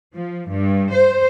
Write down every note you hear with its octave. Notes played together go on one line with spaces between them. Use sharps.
F3
G2
C5